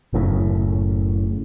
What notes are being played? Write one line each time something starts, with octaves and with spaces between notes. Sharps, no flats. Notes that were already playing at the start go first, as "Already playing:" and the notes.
F#1 F#2 A2 C#3